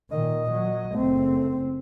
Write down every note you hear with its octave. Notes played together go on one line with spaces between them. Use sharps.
A#2 D#3 D#5
F#3
F#1 A3 C4